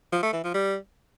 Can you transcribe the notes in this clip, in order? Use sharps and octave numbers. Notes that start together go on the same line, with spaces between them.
F3
A3
E3
F3
G3